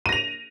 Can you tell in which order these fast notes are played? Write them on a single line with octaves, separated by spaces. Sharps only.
D#7 A#6 F7